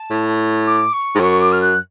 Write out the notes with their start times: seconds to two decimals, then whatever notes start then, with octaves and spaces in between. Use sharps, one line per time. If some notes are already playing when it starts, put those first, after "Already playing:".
Already playing: A5
0.11 A2
0.66 D6
0.93 C#6
1.15 G#2
1.20 F#2 C#6
1.41 D6
1.52 F6
1.61 F#6